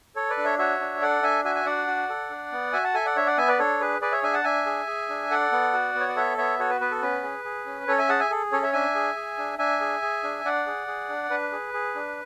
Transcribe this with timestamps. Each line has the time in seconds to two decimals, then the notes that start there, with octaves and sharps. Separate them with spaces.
0.16 A4 C#5
0.30 B4 D5
0.37 D4
0.45 C#5 E5
0.58 F#4 C#5 E5
0.80 D4
1.01 A4 D5 F#5
1.22 D4 E5 G#5
1.45 F#4 E5 G#5
1.55 G#5
1.65 D4 D5 F#5
1.87 F#4
2.09 A4
2.30 D4
2.52 B3
2.73 F#4 E5 G#5
2.84 F#5 A5
2.94 A4 E5 G#5
3.05 D5 F#5
3.16 D4 C#5 E5
3.26 D5 F#5
3.37 B3 E5 G#5
3.48 B4 D5
3.59 D4 A4 C#5
3.80 G#4 B4
4.01 G#4 B4 D5
4.12 C#5 E5
4.23 D4 E5 G#5
4.33 F#5 A5
4.44 D4 E5 G#5
4.66 G#4
4.87 G#4
5.09 D4
5.31 A4 D5 F#5
5.52 B3
5.73 F#4
5.95 B3
6.00 C#5
6.08 D5
6.16 A4 C#5 E5
6.38 B3 C#5 E5
6.59 F#4 A4 C#5
6.70 B4
6.80 B3 B4
6.91 A4
7.02 C#4 B4
7.23 G#4
7.44 G#4
7.66 C#4
7.87 C#4 A4 C#5
7.98 E5 G#5
8.09 G#4 F#5 A5
8.20 E5 G#5
8.30 G#4 A4
8.52 C#4 A4 C#5
8.62 C#5 E5
8.73 D4 E5 G#5
8.95 G#4
9.16 G#4
9.38 D4
9.59 D4 E5 G#5
9.80 G#4
10.02 G#4
10.24 D4
10.45 D4 D5 F#5
10.67 G#4
10.87 G#4
11.09 D4
11.30 D4 B4
11.52 G#4
11.74 G#4
11.95 D4